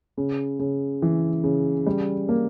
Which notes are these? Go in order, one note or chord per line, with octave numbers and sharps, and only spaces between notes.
C#3
C#3
E3
C#3
G3
A#3